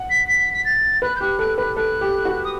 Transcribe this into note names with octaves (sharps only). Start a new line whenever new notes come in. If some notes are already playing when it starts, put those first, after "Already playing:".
Already playing: F#5
B6
B6
B6
A6
B4 F#6
G6
G4 F#6
A4 F#6
B4 F#6
A4 F#6
G4
F#4
D#6